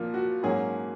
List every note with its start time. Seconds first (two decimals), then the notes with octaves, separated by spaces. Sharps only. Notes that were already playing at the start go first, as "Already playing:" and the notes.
Already playing: A#2 F3 A#3 F4
0.14 F#4
0.43 G#2 F#3 A#3 C#4 G#4